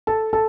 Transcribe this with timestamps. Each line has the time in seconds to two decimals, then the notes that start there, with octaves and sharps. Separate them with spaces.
0.07 A4 A5
0.33 A4 A5